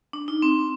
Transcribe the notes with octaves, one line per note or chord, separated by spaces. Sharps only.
D4
D#4
C4